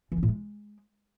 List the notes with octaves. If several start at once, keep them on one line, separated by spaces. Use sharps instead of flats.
E3
C#4
A2
G#3